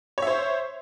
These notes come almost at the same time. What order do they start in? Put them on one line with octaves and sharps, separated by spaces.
C#5 E5 C5